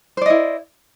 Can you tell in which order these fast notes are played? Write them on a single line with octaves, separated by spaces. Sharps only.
C5 D5 D#5 E4